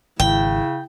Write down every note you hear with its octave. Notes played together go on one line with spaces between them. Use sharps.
G#1 C#3 E4 G5